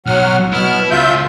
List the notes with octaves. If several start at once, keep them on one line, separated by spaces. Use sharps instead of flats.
B1 F#3 F#5 F6
B2 B3 E4 F6
C#2 F4 E5 G6